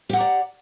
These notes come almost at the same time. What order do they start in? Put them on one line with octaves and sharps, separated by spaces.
G4 F#5 A#5 D5